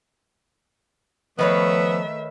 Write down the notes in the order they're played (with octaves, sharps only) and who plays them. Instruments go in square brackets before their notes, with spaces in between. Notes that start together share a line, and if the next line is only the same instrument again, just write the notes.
[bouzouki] D#3 B4 C#5 [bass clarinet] F3 [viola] A3 E5 [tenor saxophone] B3